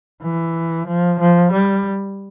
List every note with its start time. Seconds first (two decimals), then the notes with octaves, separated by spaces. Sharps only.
0.23 E3
0.87 F3
1.20 F3
1.52 G3